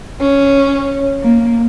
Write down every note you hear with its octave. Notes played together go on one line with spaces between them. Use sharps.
C#4
A#3